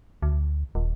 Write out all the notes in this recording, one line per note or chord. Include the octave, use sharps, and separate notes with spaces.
D2
D#1